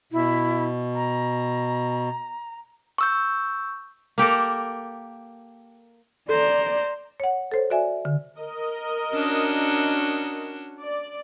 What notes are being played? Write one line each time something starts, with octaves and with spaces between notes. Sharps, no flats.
B2 E4
A#5
C#6 E6 G6
A#3 G4 A4 A#4
A4 C5 D5 A#5
C#5 F#5
A4 C5 C#5
F#4 D5 E5 G#5
D3
A#4 D#5
C#4 D4 F#4
D5